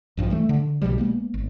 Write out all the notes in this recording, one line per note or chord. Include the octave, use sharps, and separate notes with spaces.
B1 G2 F3
E3 G3 A3
D3
B1 B2 F3 G3
G#3 A#3 B3
G#1